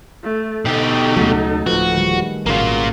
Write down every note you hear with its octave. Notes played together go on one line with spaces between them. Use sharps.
A3
B2 D#4 G4 A4
D2 C#3 F#3 G#3 A3 F#5
D1 F3 F#4 B4
D#3 G3 G#3
G#1 C#3 A#3 F4 F#4